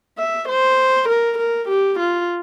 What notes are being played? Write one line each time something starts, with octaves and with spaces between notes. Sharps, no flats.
E5
C5
A#4
A#4
G4
F4